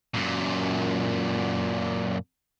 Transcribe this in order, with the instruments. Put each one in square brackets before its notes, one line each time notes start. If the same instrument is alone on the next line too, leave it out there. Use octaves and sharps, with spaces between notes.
[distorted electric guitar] F#2 A#2